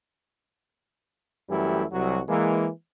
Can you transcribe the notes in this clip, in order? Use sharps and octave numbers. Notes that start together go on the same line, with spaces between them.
F#2 E3 G3 A3 E4 G4
C2 F#3 F#4
E3 G#3 A#3